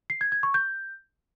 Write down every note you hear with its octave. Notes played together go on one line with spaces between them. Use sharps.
C7
G#6
G#6
C#6
G6